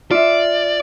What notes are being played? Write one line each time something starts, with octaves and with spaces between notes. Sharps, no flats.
F4 D5 E5